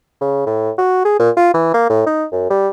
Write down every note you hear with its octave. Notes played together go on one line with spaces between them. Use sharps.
C#3
A2
F#4
G#4
A#2
F4
E3
A#3
A2
D#4
F#2
G3